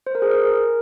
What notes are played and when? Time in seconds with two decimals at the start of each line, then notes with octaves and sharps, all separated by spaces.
0.07 C5
0.15 A#4
0.22 G#4
0.31 A#4